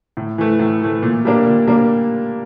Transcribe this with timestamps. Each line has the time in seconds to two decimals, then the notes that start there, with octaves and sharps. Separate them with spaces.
0.17 A2
0.38 E3 A3
0.59 A2
0.82 E3 A3
1.03 A#2
1.25 G3 A#3 D4
1.47 A#2
1.68 G3 A#3 D4